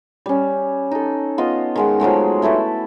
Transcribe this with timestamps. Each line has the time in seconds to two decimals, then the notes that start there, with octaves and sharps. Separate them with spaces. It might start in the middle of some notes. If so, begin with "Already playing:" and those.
0.26 G3 C#4
0.91 D#4 A4
1.38 B3 F4 D#5
1.76 D#3 G#3 F#5
2.00 F3 F#3 G#3 A3
2.42 A3 E4 A4 B4